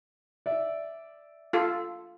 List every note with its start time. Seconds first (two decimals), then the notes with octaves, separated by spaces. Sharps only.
0.46 D5 E5
1.53 F4 A4